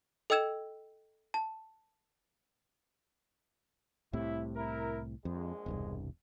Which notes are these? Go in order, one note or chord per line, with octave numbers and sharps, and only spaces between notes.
A4 D#5 G5 E6 G#6 E7
A5
C2 A2 C3 E4
E4 A#4
A#1 F2 G#3
E1 C2 G2